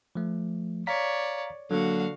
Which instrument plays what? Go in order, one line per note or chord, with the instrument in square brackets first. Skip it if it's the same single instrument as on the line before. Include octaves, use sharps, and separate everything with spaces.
[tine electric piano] F3 A3
[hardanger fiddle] C#5 D5 [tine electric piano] F5 A#5 B6
[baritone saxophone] D3 [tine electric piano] F#3 A#3 [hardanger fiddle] F#4 F5